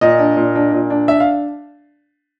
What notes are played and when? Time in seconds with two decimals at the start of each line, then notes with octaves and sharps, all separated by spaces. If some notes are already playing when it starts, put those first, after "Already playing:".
0.01 A#2 D#5
0.19 D4
0.37 A#2
0.55 D4
0.72 A#2
0.90 D4
1.08 D4 E5
1.20 F5